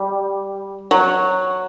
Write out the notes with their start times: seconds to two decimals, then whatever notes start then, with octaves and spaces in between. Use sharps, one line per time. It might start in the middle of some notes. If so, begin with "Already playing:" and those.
Already playing: G3
0.91 F#3